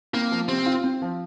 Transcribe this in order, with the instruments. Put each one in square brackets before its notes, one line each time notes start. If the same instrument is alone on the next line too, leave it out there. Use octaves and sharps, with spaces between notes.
[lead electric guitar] A#3 [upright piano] C4
[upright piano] F3
[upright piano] C3 [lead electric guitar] C4
[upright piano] F4
C4
F3